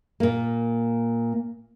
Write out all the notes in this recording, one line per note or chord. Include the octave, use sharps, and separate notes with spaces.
A#2 A#3